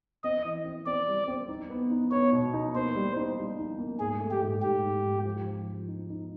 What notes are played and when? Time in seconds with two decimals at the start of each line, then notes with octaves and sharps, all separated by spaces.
0.24 C4 D#5
0.44 E3
0.65 C4
0.86 C4 D5
1.08 G3
1.28 C4
1.48 D#4
1.70 B3
1.91 D#4
2.11 B3 C#5
2.33 B2
2.53 D#4
2.75 A#3 C5
2.95 G3
3.16 D#4
3.37 G3
3.58 D#4
3.79 A#3
4.00 G#2 G#4
4.20 A3
4.31 G4
4.41 G#2
4.62 G#2 G4
4.84 G#2
5.04 G#2
5.25 F3
5.47 F3
5.67 F3
5.88 D#4
6.10 D#4